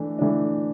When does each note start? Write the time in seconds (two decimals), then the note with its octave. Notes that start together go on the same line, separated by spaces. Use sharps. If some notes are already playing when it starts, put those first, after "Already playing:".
Already playing: E3 A3 D4
0.18 E3 A3 D4